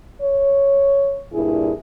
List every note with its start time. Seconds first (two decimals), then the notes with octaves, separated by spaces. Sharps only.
0.22 C#5
1.32 G2 A#2 E4 G#4